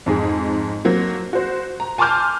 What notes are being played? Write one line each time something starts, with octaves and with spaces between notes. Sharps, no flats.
F2 G#2 G#4
F#3 A#3 C4
F#4 C5
A#5
G#5 A5 C6 D6 F6 G6